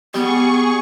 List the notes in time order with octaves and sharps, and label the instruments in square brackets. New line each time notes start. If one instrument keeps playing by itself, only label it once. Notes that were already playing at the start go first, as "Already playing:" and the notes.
[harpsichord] G3 [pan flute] B3 [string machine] G#4 C#6